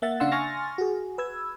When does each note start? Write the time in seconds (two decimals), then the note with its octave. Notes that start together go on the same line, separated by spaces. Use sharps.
0.02 A#3 E5 F#5 A6
0.20 C#3 D4 F5 F#5 C6 E6
0.32 G#5 C6 C#6 F6 A6 A#6
0.78 F#4 G#4
1.18 B4 E6 G#6